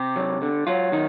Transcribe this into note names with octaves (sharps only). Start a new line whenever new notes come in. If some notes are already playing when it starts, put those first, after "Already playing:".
Already playing: C3 G4
F#3
D3
F#3 F4
D#3 D#4